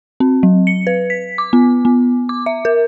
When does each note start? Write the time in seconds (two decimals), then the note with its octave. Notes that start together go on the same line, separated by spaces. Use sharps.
0.20 C4
0.43 F#3
0.67 C#7
0.87 B4
1.10 B6
1.38 D6
1.53 B3
1.85 B3
2.29 D6
2.46 E5
2.65 A#4